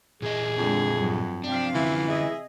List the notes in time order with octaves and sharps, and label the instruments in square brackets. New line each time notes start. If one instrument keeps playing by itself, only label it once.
[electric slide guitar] A#2 E3 D#5 [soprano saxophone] G#4
[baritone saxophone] F2 [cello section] D3 G#3
[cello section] G2 F#3
[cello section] C3 F3 F5 [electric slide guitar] D4 [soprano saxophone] G5
[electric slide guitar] D3 A3 C#4 [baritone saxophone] E3 [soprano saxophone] E5
[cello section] G#4 D#5 [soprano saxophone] E5